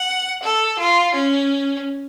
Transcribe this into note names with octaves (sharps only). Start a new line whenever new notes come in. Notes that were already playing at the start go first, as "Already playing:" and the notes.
Already playing: F#5
A4
F4
C#4